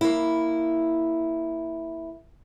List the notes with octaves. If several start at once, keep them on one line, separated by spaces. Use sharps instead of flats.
A#3 E4